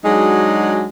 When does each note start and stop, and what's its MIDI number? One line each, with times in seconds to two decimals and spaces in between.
0.05 0.88 54
0.05 0.88 56
0.05 0.88 62
0.05 0.88 63
0.05 0.88 66
0.05 0.88 68